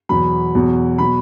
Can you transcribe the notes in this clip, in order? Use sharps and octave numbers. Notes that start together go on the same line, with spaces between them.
E2 B2 F#3 B5
E2 B2 F#3
B2 F#3 B5